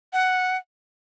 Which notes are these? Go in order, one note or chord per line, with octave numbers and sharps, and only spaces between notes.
F#5